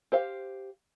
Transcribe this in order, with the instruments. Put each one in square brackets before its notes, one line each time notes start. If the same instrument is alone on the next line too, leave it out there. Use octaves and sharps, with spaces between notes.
[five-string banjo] G4 C5 F5